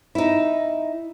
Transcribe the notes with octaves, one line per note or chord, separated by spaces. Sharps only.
D#4 E4